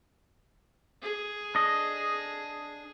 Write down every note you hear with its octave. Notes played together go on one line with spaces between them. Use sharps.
G#4
D4 D#5